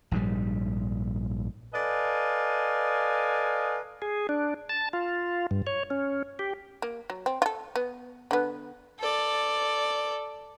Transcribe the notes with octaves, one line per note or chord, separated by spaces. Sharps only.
A#1 G#2 C3 G3
A4 B4 D5 D#5 F5 G#5
G#4
D4
A5
F4
G2
C#5
C#4
G4
A#3
F#3
C4
F4 A4
B3
D3 B3
A4 D5